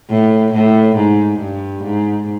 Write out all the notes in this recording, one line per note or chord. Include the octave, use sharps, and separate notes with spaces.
A2
A2
G#2
G2
G#2